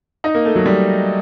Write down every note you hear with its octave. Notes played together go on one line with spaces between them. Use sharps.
D#4
A#3
A3
F#3
G3